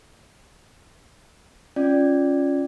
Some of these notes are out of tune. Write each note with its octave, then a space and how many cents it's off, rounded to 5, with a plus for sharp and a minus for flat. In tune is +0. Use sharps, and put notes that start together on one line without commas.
C#4 +0 F4 +0 D5 +0